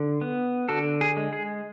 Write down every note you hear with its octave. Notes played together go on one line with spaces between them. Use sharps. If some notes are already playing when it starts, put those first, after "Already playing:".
Already playing: D3
B3
D3 F#4 A4
G#4
G#3
G#4